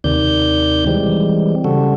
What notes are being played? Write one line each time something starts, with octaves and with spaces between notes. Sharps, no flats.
D#2 C3 D#3 D5 G6
E3 G3 G#3 C4
C#3 G3 F#4 A4